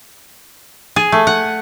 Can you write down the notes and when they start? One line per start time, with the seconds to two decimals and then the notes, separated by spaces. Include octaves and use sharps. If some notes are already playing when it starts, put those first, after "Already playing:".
0.96 G#4
1.12 A3
1.27 F#5